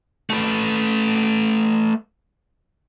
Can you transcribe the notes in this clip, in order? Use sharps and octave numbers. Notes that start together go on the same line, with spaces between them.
A3 B4